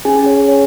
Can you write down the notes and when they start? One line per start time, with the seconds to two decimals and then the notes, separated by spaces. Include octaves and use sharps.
0.05 C#4 G#4 G#5
0.26 C#5
0.48 C#5